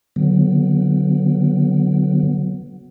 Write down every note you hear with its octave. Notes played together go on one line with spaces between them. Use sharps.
D3 F#3 B3